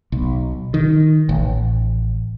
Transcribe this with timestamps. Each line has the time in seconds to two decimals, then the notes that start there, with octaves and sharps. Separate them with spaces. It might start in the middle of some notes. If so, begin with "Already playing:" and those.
0.12 B1
0.74 D#3
1.29 A1